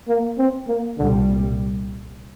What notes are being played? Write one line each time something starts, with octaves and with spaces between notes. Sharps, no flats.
A#3
C4
A#3
C2 A#2 D3 G3